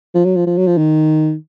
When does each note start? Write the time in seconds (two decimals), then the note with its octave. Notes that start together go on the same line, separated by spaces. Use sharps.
0.14 F3
0.25 F#3
0.36 F3
0.47 F3
0.58 F#3
0.67 F3
0.78 D#3